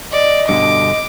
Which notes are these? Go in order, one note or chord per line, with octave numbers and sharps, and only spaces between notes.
D5 D#5
G2 B2 D3 D6